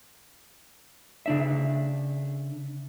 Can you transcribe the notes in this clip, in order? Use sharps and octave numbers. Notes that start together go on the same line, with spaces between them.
C#3 D4 E5